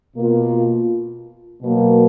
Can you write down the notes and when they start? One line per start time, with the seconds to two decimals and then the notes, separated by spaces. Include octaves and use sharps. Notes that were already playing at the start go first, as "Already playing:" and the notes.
0.16 B2 A#3 F4
1.62 B2 F#3 A#3